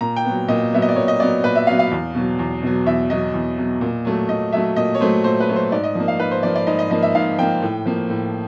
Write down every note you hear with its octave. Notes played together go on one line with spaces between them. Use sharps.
A#2 A#5
G5
F#3 B3
A#2 D#5
F#3 B3 E5
D#5
D5
A#2 C#5
D#5
F#3 B3 D5
A#2 B4
E5
F#3 B3 F5
F5
E2
B2 F#3
E2
B2 F#3
E2 E5
B2 F#3 D#5
E2
B2 F#3
A#2
F#3 A3
A#2 D#5
F#3 A3 E5
A#2 D#5
C#5
F#3 A3 C5
A#2 C5
B4
F#3 A3
C5
G#2 D5
D#5
F3 A#3
F5
G#2 B4
C5
F3 A#3 D5
D5
G#2 D#5
D#5
F3 A#3 D#5
E5
G#2 F5
F3 A#3 G5
A2
F3 A#3
A2